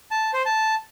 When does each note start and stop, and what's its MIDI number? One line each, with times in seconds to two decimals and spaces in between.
0.11 0.31 81
0.34 0.42 72
0.46 0.75 81